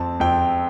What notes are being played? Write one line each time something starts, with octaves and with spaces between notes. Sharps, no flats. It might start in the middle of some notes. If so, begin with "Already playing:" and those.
Already playing: F2 C4 A5
F2 G5